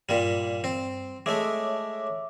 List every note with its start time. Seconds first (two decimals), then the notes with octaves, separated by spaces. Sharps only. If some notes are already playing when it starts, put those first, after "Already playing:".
0.09 G2 A#2 G3
0.64 C4
1.26 G#3 A3 C#5 E5 D6